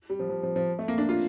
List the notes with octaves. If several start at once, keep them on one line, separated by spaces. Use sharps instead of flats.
G3
F3
F3
F3
F3
A3
A#3
D4
F4